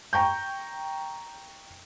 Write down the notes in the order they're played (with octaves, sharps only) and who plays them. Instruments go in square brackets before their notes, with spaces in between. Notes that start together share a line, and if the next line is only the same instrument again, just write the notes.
[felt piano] G5 A#5 C#6 G6